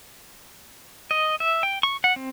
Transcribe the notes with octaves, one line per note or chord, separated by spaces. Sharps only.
D#5
E5
G5
C#6
F#5
C4